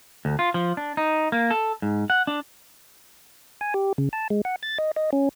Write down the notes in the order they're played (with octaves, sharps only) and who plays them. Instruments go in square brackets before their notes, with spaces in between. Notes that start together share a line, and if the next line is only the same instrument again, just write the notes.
[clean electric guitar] D2
F4
F3
D4
D#4
A#3
A4
G#2
F#5
D4
[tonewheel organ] G#5
G4
C#3
A5
G#3
F#5
A6
D#5
D#5
C#4